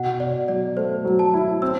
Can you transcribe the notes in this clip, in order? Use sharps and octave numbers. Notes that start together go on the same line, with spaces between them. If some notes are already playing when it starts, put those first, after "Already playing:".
Already playing: B2 F#5
B2 D5
F#3 D5
A3 C5
F#3
A5
E4
C4 E6